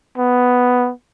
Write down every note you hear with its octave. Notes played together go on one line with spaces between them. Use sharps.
B3